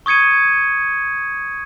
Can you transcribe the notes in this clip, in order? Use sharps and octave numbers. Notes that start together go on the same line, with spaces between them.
C#6 D#6 G#6 C#7 D#7